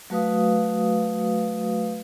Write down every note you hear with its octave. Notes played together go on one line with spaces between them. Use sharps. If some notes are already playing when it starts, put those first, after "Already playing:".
F#3 A3 F#4 B4 F5 D#6